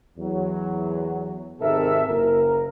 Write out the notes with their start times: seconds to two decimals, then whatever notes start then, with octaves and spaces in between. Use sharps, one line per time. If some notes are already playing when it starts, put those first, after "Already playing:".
0.18 E2 F#3
1.61 G#1 G#2 C3 A4 A#4 E5
2.07 F#1 A#4